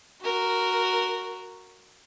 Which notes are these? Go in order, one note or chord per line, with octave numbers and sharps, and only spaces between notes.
F#4 A#4